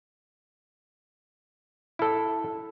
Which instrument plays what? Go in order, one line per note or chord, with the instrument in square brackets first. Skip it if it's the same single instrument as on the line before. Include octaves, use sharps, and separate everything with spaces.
[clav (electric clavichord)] E4 A4